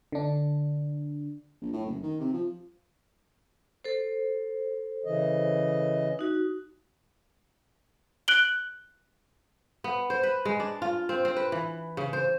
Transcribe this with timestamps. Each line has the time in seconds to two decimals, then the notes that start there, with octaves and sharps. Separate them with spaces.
0.12 D3 D4
1.61 A#1
1.73 A2
1.86 F#1
2.02 D#3
2.20 C3
2.34 F3
3.84 A4 C5
5.05 C#3 E3 D#5
6.19 D#4 F#4
8.28 F#6 D7 F#7 G7
9.84 B3
10.10 C5
10.23 B4
10.45 G#3
10.60 D4
10.82 F4
11.09 C4
11.25 C4
11.37 B4
11.52 E3
11.97 C#3
12.13 C5